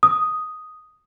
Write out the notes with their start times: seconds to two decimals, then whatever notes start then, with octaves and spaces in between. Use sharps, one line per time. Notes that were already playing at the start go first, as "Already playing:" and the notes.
0.03 D#6